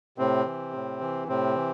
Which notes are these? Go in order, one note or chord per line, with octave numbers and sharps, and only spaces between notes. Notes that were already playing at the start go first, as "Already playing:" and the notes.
A2 C3 C4
E3
A2
E3
A2 C3 C4
E3